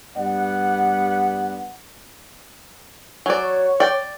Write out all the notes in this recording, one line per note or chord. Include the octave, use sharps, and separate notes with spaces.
G2 G3 B3 D5 F#5
F#3 D5 G#5
C#5
D5 G5